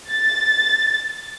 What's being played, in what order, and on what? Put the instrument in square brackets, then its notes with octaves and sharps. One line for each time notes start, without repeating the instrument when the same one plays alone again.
[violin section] A6